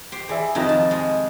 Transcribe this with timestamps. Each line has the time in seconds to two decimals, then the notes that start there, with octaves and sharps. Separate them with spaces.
0.12 G4 C5
0.29 E3 G#4 D5 E5
0.55 F2 C3 D#3 F3 D#4
0.69 A5
0.91 G#3